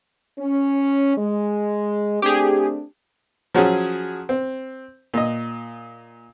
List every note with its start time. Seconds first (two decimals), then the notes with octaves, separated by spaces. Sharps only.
0.39 C#4
1.18 G#3
2.22 A3 C4 D4 G4 G#4
3.55 F3 F#3 C#4 G#4
4.29 C4
5.14 A#2 D#5